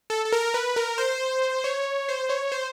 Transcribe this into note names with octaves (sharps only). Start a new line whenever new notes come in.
A4
A4
A#4
B4
A#4
C5
C#5
C5
C#5
C5